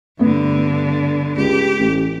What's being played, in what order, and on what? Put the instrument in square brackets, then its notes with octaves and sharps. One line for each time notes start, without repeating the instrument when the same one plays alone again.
[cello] G2 D3 [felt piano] A3 B3
[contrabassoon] C#2 [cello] G4
[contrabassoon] A1